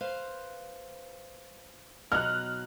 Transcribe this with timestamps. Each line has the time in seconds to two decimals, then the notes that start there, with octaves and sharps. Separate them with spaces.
0.01 B4 C5 F5
2.12 B2 F#3 D#4 F6 F#6